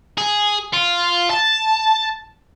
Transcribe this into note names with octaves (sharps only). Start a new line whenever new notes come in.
G#4
F4
A5